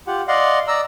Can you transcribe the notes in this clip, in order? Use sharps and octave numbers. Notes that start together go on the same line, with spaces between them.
F4 G4 F#5
D5 D#5 F5 F#5 C6
D5 D#5 A#5 E6